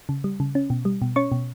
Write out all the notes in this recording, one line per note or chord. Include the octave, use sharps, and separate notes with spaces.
C#3
G3
C#3
C#4
B2
G3
B2
C#4 C#5 C#6
B2